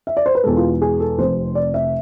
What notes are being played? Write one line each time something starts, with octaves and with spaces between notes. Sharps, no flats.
E5
D5
C5
B4
E2 B2 G#3 A4
F4
G#4
A4
F1 F2 C3 C5
D5
E5